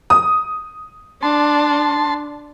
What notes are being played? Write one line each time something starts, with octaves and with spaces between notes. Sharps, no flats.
D#6
D4 A5 C6